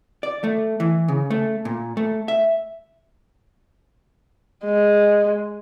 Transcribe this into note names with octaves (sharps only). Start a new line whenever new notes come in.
D5
A3
E3
C#3
A3
A#2
A3
E5
G#3